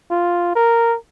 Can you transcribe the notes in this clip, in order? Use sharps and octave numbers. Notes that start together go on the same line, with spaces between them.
F4
A#4